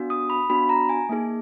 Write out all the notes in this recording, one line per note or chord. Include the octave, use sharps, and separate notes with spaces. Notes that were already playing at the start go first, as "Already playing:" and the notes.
Already playing: B3 D4 F#4
D#6
B5
B3 D4 F#4 B5
A#5
G#5
A#3 D#4 G#4